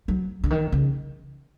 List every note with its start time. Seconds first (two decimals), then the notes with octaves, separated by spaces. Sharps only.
0.08 F#3
0.44 D3
0.50 D#3
0.72 C#3